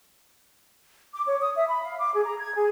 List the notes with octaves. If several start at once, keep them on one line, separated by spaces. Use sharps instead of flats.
D6
C#5
D#6
E5
B5
F5
D6
G#4
A#5
G#6
G#4